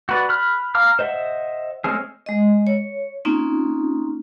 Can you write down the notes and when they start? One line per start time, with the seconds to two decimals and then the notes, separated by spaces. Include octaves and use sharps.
0.09 F#4 B4 D5
0.29 B5 F6 F#6
0.75 F5 A#5 D6 F6
0.99 C5 D#5 E5 F#5
1.84 G#3 A3 C4 C#4 G#4
2.26 G#3 D#5
2.67 C#5
3.25 A#3 C4 C#4 D#4 F4